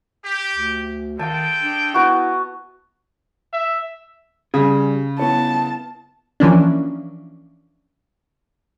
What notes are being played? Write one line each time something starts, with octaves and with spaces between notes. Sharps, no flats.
G4
D2
D#3 G#3 A4 F5 G5 A5
D4
B3 E4 F#4
E5
C#3 G3 G#4
B3 E4 C#5 A5
E3 F3 A#3 C#4 D4